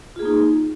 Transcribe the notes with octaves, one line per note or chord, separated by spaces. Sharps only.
A#3 D#4 F4 G#4